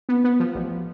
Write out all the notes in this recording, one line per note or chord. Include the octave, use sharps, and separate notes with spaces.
B3
B3
F3
A1